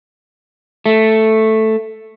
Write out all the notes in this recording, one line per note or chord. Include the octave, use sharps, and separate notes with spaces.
A3